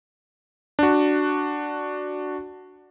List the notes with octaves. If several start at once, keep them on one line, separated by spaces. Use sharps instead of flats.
D4 F#4